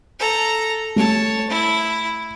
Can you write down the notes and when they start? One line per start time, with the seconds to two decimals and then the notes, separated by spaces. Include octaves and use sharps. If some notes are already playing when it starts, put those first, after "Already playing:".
0.19 A4 A#5
0.96 A3 C#5 A5
1.49 E4